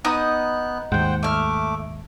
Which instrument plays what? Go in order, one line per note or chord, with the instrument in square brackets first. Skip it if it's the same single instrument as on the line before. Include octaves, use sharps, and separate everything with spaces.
[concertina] B3 F#6 [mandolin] D#4 D#6
[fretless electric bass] D#2 G#2 [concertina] C5 F#5 G5
[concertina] A3 D6 [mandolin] E5 F6